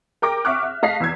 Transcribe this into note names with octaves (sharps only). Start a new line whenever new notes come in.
A#4 G5 D6 A#6
E5 F#5 C#6 D6 F6 F#6
E5
A3 D#5 F5 A5 B6 C7
E2 E6 G#6